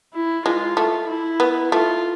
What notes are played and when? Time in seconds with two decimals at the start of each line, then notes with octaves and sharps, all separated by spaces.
0.14 E4
0.46 G#3 F4
0.77 A3
1.08 E4
1.40 B3
1.72 A3 F4